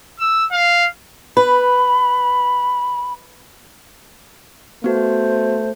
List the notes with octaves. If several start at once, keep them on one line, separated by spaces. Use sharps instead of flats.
E6
F5
B4 B5
A3 B3 F#4 C5